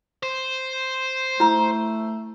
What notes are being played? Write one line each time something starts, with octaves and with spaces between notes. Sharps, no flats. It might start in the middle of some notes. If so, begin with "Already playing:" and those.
C5
A3 E4 A#5